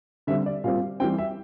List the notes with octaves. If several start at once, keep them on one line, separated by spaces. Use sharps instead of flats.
D3 G3 C4 E5
D5
A#2 G3 C4 F5
E3 G3 C4 G5
E5